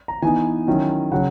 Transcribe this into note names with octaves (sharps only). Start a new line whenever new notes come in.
A#5
E3 B3 D#4 G#5
D#3 F#3 C#4 E4
C#3 F#3 F#5